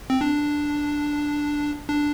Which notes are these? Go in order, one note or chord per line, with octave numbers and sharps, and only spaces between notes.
C4
D4
D4